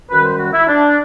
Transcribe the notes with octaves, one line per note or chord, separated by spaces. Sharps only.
F#2 D#3 G3 B4
C5
F#4
E4
D4